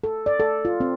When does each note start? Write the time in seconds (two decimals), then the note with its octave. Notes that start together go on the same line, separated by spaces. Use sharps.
0.04 A4
0.26 D5
0.40 A4
0.65 F4
0.80 C4